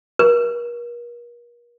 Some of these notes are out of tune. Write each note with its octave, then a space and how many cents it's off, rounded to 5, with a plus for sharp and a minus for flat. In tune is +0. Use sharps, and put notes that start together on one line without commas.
A#4 +40